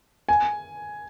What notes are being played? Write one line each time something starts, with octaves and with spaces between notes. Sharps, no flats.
G#5